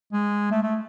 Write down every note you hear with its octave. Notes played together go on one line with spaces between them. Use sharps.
G#3
A3
A3